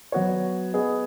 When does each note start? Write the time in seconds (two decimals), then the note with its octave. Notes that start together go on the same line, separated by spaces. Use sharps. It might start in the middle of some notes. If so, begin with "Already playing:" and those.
0.12 F#3 B3 F#4 C#5
0.73 B3 G#4 D#5